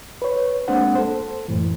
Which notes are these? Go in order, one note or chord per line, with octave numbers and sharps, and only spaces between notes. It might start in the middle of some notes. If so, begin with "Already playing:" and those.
B4 C#5
G#3 A#3 C4 D4 C5 F#5
A4 C5
F#2 A2 E3